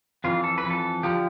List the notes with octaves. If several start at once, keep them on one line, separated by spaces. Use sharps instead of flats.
F2 E3 F4
A4
B4
F2 E3
A4
D3 F3 G4